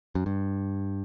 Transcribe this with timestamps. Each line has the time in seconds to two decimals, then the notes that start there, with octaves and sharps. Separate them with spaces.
0.15 F#2
0.26 G2